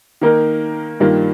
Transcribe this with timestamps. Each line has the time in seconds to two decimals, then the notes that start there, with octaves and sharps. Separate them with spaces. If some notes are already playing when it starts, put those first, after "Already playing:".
0.21 D#3 A#3 D#4 A#4
1.00 G2 D#3 G3 A#3 F4